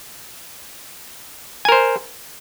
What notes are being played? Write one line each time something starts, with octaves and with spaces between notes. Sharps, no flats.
A#4 C5 G#5